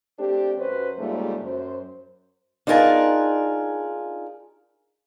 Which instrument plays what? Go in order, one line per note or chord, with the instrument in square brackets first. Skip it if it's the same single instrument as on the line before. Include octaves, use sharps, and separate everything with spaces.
[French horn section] A3 C4 D4 G4
F#2 F#3 B4 C5
G#2 C#3 G3 A3 A#3 F4
F#2 C5
[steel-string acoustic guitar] D4 D#4 F4 G#4 A#4 A5